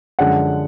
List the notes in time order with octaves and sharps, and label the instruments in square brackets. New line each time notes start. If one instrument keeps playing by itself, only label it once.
[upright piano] F#2 D3 F3 G#3 F#5